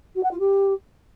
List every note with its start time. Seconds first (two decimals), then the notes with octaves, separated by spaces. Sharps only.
0.15 F#4
0.23 F#5
0.31 F4
0.39 G4